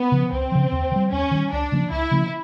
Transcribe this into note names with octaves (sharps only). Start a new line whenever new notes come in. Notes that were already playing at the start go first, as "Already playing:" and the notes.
Already playing: B3
C#3 F3
C#2 C4
C#3 F3
D#2
D#3
G3
D#2 C#4
D#3 G3
C#2 D4
C#3 F3 A#3
C#2 E4
C#3 F3 A#3